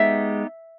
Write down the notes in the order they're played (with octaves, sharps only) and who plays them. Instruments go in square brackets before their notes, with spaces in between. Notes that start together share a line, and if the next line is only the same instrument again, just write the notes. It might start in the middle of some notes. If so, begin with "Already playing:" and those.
Already playing: [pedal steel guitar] G#3 B3 D#4 G4 [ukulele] E5